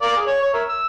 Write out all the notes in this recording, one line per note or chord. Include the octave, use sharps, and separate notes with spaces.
A#4 D5 F5
G#4
C#5
C#5
A#4 E5
E6